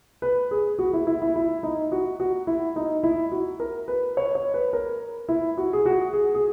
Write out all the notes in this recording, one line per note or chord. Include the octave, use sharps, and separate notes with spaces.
B4
G#4
F#4
E4
E4
E4
E4
D#4
F#4
F#4
E4
D#4
E4
F#4
A#4
B4
C#5
C#5
B4
A#4
E4
F#4
G#4
F#4
G#4
G#4